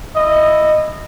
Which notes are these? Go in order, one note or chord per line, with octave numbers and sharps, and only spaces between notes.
E4 D#5